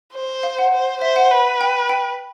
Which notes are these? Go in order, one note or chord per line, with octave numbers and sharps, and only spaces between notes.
C5
F5
F#5
C5
C5 E5
F#5
B4
G5
G5